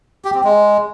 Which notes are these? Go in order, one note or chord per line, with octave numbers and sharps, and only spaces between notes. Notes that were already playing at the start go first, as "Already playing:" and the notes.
G4
C4
G#3